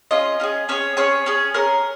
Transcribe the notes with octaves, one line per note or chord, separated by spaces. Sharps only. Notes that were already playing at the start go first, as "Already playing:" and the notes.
C#4 F4 G#4 D#5
C#4 F4 G#4
C#4 G#4 C#5
C#4 G#4 C#5
C#4 G#4
C#4 G#4 A#4